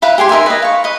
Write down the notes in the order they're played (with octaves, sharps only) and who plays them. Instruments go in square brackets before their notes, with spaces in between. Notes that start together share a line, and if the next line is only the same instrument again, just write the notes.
[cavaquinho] E4 B4 F5 B5
G4 G#4 G#5 C6
D#4 A#4 E5 G#5
B4 D#5
F5 C#6
B4 D#5